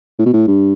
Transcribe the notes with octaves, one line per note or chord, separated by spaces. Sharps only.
A2
B2
A2
G2